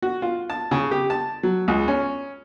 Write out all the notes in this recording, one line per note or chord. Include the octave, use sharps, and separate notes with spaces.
F#4
F4
A5
C#3
G4
A5
F#3
C#2
C#4